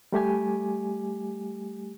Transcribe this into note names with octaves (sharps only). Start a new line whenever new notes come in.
G3 A3 G4 G#5